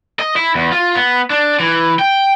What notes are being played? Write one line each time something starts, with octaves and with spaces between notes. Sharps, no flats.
D#5
E4
E2
F4
B3
D4
E3
G5